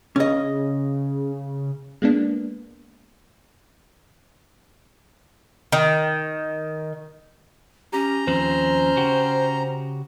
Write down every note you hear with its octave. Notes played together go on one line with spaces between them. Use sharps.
C#3 C#4 D#5
G#3 A#3 B3 D4
D#3
C#4 G4 A#5
D#2 F3 C4 C5
C#3 F#4 G4